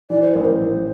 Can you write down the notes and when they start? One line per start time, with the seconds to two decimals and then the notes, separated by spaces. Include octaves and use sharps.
0.10 E3 D5
0.22 C5
0.33 A1 A#4
0.45 C5
0.61 A1